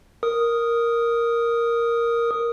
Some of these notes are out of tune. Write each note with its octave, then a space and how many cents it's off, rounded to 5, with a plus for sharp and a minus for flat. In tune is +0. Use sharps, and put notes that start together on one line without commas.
A#4 +0 D#6 +0